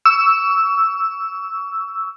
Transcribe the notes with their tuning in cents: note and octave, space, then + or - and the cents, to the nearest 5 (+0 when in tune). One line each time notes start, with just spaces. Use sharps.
C#6 +30 E6 +0